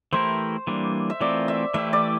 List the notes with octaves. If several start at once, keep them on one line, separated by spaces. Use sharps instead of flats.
E3 A3 E4 G4 A#4 C5
E3 G3 A#3 D4
E5
E3 A3 C4 F4 A#4 D5
E5
E3 A3 E4 G4 E5
D5